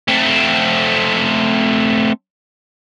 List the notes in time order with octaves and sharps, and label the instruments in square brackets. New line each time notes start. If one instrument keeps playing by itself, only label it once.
[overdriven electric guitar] A3 C4